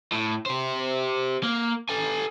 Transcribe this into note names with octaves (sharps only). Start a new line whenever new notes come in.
A2
G4 C5
A#3
A4 G#5